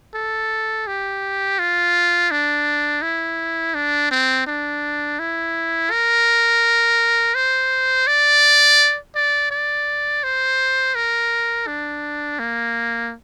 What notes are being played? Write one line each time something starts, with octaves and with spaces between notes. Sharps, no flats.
A4
G4
F4
D4
E4
D4
C4
D4
E4
A#4
C5
D5
D5
D5
C5
A#4
D4
A#3